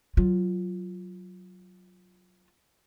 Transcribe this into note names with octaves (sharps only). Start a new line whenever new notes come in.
F#3 F4